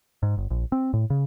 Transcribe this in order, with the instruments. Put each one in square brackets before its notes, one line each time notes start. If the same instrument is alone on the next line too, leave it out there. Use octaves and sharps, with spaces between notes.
[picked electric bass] G#2
G1
A#1
C4
A2
C#3